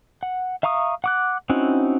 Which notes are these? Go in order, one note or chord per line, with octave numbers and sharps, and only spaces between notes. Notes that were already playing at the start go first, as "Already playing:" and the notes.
F#5
E5 F5 A#5 C#6 D#6
F#5 D6 F#6
C4 C#4 D#4 E4 F#4